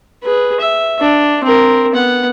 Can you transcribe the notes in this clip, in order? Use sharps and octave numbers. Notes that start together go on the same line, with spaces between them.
G#4 B4
E5
D4
C4 A#4
B3 F#5